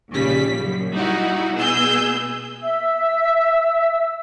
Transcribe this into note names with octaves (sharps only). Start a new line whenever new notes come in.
A#1 D#2 C#3 G3 B6
F#2
G3 D#4 E4 F#4
B2 B3 G#4 E6 G6
E5 E6